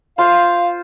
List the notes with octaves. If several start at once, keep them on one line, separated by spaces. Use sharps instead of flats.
F4 C5 F5